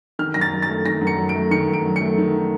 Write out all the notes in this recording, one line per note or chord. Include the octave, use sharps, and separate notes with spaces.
D#3 F6
F#2 A#6
A6
F#3
A6
A3
D#3 A#6
F#2
C#7
F#3
D7
A3
D#3 C#7
F#2
D7
F#3
A3 C#7
D#3